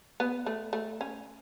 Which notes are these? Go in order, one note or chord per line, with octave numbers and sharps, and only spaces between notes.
B3
A3
A3
C#4